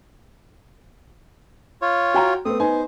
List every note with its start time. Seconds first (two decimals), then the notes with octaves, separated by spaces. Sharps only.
1.82 F4 C#5
2.14 F#4 G5 A#5
2.45 A3 B3 C4 D#6
2.60 B3 D#4 C5 G#5